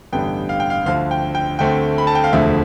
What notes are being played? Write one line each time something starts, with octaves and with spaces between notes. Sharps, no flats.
A1 G2 D3 G3 B3 G5
F5
G5
F5
D2 D3 F3 F5
G5
G5
D2 D3 A3 C4 G5
B5
A5
G5
F5
E1 D2 D3 F3 A3 E5